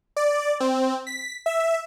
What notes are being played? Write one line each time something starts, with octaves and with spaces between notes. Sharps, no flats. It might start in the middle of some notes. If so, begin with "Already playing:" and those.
D5
C4
B6
E5